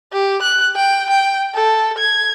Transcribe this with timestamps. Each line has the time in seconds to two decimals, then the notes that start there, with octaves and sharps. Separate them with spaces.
0.13 G4
0.42 F#6
0.75 G5
1.10 G5
1.54 A4
1.98 G#6